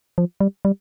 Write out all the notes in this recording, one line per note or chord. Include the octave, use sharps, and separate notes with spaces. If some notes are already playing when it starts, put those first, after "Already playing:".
F3
G3
G3